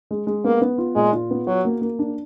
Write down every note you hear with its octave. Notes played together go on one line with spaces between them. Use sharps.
G#3
G#3
A#3 B3
B3
F4
A#2 G#3
F4
B3
F#3 F#4
A#3
A#3
D4